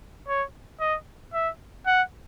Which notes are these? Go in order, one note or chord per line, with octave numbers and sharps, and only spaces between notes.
C#5
D#5
E5
F#5